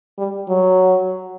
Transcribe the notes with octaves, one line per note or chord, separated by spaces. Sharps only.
G3
F#3